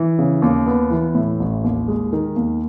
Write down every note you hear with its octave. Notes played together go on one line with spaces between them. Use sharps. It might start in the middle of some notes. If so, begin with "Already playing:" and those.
Already playing: E3
C#3
D#2
B3
E3
A2
A1
D#2
G#3
D#3
D#2